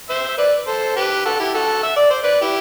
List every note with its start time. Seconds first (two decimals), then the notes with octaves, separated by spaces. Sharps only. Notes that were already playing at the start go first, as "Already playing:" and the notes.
0.09 C5 E5
0.29 E5
0.38 B4 D5
0.67 A4 C5
0.96 G4 B4
1.25 F#4 A4
1.39 E4 G4
1.54 F#4 A4
1.83 E5
1.96 D5
2.10 C5
2.23 B4 D5
2.41 E4 G4